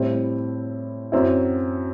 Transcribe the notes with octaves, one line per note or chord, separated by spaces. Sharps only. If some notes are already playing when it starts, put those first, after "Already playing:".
Already playing: A2 G3 C4 E4
F#2 F#3 C4 E4